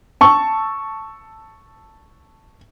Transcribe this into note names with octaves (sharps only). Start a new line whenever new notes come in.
A5 C#6 E6